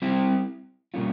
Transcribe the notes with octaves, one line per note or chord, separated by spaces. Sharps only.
G3 C4 E4 G4
B2 G3 A#3 C#4 F4